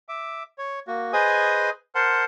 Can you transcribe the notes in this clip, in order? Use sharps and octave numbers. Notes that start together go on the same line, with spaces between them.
E5 D6
C#5
A#3 F#4
G#4 B4 C5 D#5 G#5 D#6
A#4 C5 F#5 A5 C6